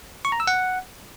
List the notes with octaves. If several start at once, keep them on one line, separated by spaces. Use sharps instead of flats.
C#6
A#5
E6
F#5